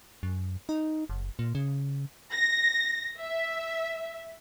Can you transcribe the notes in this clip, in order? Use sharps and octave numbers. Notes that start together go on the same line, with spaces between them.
F#2
D#4
F#1
A#2
C#3
A#6
E5